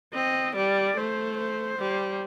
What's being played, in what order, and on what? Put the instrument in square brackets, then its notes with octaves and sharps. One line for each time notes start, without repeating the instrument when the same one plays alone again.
[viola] C4 [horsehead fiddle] D#5
[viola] G3 [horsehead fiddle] D5
[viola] A3 [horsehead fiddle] C5
[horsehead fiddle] C5
[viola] G3